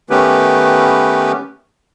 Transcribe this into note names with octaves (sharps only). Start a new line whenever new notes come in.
D#3 A3 B3 C#4 G4 B4